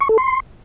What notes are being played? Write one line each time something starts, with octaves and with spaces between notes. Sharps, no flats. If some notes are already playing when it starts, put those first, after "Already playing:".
C#6
A4
C6